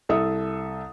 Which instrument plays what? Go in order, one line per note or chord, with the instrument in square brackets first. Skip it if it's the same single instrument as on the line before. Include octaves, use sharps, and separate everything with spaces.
[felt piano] C2 A4 E5 D#6